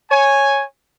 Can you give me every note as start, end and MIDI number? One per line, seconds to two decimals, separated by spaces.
0.11 0.63 73
0.11 0.63 80